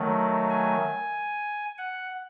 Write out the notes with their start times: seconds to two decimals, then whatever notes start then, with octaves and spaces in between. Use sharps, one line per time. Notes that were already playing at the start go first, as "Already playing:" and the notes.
Already playing: D#3 F#3 A3
0.50 G#5
1.78 F#5